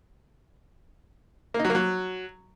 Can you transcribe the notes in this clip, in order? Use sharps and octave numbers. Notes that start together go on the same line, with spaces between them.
A#3
D#4
F#3
A#3
F#3